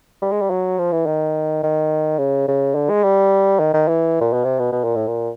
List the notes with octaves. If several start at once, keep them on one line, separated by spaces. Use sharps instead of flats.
G3
G#3
G3
F#3
F3
E3
D#3
D#3
C#3
C#3
D3
G#3
G3
D#3
D#3
E3
A#2
B2
C3
B2
B2
A#2
A2
A#2